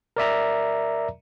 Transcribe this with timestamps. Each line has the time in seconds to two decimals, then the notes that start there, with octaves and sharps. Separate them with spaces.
0.17 A#4 D5 E5 A#5